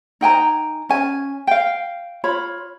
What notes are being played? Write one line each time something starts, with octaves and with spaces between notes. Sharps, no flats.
D#4 G5 G#5 A#5
C#4 G#5
F5 G5
F4 C#5 B5